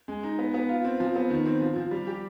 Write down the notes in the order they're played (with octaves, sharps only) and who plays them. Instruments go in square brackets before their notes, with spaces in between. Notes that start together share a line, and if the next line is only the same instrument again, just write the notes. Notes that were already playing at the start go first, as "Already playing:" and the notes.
[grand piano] G#3
D#4
B3
B3
F4
C4
F3
B3
D#3
C4
F3
F3
G3
G4